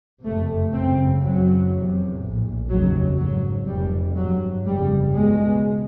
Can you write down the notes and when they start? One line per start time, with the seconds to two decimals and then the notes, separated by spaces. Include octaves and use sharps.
0.24 F#1 F2 C3 A3
0.73 G#1 F#2 C#3 C4
1.23 F#1 F#2 C#3 F#3
1.72 F1 E2 C3
2.20 A#1 A2
2.69 F1 D#2 C#3 F#3
3.18 G#1 G#2 F#3
3.67 F1 F2 C3 G3
4.16 G#1 G2 F#3
4.65 G1 F2 C#3 G3
5.15 C#2 B2 G#3